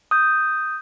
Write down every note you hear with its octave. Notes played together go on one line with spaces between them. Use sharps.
D#6 G6